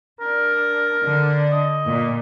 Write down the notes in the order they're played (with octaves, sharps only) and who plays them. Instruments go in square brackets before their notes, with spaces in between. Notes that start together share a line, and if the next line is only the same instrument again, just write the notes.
[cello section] D4 [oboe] A#4
[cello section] D3 D4
[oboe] D#5
[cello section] A#2